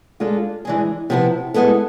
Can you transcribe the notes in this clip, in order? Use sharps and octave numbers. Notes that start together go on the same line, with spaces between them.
G#3 D4 F4 A4
E3 G#3 D4 G#4
C3 F3 B3 E4
G#3 B3 E4 A4